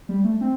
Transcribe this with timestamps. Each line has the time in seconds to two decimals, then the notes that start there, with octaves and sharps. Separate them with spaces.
0.09 G3
0.24 A3
0.41 C4